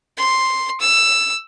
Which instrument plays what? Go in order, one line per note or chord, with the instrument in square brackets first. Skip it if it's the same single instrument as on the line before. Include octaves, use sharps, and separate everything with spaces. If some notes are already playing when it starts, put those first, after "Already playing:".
[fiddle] C6
E6